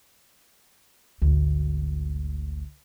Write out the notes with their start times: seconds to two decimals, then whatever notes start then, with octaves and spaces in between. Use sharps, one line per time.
1.22 G#1 D2